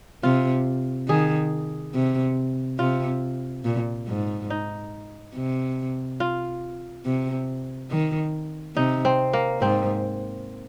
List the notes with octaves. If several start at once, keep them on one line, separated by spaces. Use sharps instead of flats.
C3 F4
D#3 G#4
C3
C3 F4
A#2
G#2
D#4
C3
F4
C3
D#3
C3 D#4
C4
A#3
G#2 C4